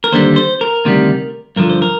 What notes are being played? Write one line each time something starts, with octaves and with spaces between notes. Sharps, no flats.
A#4
D#2 D3 G3 C5
C5
A#4
D2 C3 D#3 G3
G2 D3 F3 A#4
C5
A#4